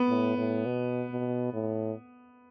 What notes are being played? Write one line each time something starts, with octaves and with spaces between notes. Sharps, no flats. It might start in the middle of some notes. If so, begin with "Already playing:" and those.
Already playing: B3
A2
A2
B2
B2
A2